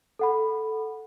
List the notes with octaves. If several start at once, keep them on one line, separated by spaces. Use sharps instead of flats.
A4 F#5 B5